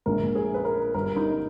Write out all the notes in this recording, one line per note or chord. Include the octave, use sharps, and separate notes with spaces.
A#1 A#2 G#3 A#4
G#4
B4
A#4
G1 G2 G3 A#4
D#4